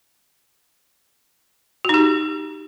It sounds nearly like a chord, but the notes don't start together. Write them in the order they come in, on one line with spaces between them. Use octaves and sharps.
F#4 D#4 G4